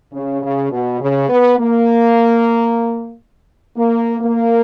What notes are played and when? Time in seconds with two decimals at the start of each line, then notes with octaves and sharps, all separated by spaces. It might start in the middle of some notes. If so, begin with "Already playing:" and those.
0.13 C#3
0.42 C#3
0.71 B2
1.00 C#3
1.29 B3
1.58 A#3
3.76 A#3
4.20 A#3